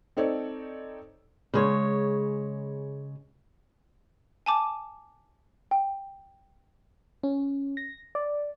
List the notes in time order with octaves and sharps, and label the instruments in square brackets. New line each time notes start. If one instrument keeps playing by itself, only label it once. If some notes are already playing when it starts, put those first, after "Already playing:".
[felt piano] C4 D#4 A4 C#5 D5
[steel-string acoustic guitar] C#3 G#3 C#5
[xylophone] G#5 A5 D6
G5
[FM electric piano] C#4
A#6
D5